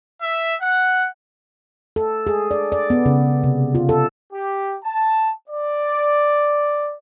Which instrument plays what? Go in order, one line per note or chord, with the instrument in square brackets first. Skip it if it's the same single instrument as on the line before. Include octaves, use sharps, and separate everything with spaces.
[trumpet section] E5
F#5
[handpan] A4
G#4
D5
D5
B3
C#3
C3
F4
A4
[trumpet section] G4
A5
D5